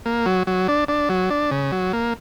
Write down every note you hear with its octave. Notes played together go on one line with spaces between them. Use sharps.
A#3
F#3
F#3
D4
D4
F#3
D4
C#3
F#3
A#3